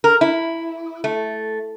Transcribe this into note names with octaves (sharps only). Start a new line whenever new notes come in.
A#4
E4
A3